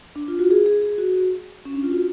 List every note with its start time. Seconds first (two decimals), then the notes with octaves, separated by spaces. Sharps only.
0.16 D4
0.28 F4
0.39 F#4
0.51 G#4
0.66 G#4
0.82 G#4
0.98 F#4
1.65 C#4
1.74 D4
1.83 F4
1.92 F#4